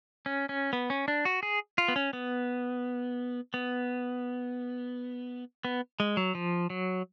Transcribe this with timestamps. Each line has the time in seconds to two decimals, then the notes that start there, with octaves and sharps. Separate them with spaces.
0.26 C#4
0.49 C#4
0.73 B3
0.90 C#4
1.08 D4
1.25 F#4
1.43 G#4
1.78 F4
1.88 B3
1.96 C#4
2.13 B3
3.54 B3
5.65 B3
6.00 G#3
6.17 F#3
6.35 F3
6.70 F#3